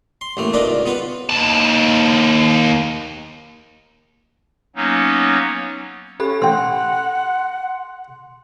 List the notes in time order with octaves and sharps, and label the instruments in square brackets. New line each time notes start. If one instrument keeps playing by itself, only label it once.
[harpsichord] C6
A1 A3 A#3
D4 D#4 F4 A#4 B4
C#2
B3 F4 B4
[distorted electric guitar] D#2 A5
[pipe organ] F#3 A#3 B3 C#4 D#4
[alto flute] C#4 [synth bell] G4 A4 B5
[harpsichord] A1 G5 [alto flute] F#5 [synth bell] C6